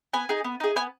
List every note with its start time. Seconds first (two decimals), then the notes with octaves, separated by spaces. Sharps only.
0.13 B3 G#5
0.29 D#4 G#4
0.44 B3
0.60 D#4 G#4
0.76 B3 G#5